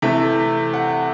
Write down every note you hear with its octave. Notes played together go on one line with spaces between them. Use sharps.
C3 E3 A3 E5
F#5